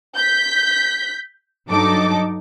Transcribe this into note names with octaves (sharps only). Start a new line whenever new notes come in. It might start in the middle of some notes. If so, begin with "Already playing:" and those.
G6 B6
G2 F#3 D#4 A4 D6